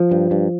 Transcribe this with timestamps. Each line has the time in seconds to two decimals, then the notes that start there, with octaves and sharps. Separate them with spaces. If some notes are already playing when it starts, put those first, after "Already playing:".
Already playing: F3
0.11 G2
0.31 G2